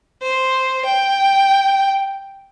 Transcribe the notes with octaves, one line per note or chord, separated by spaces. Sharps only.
C5
G5